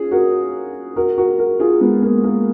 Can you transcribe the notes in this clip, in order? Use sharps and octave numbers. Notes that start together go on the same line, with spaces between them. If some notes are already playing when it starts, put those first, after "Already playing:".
Already playing: C#4 F4 G#4
F#4 A#4
F#4 A#4
F#4 A#4
F#4 A#4
F4 G#4
G#3 B3
A#3
A#3